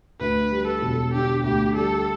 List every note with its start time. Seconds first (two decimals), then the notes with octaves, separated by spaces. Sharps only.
0.20 D2 B4
0.52 G3
0.67 A4
0.82 E1
1.13 D3 G4
1.44 D2 G4
1.75 G3 A4